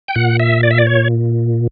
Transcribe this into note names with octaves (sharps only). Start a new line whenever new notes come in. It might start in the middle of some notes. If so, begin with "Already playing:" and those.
G5
A#2 F#5
E5
D5
E5
D5
C#5